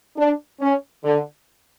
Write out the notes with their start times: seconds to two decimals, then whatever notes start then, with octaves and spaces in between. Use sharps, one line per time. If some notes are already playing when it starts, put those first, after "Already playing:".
0.17 D4
0.60 C#4
1.04 D3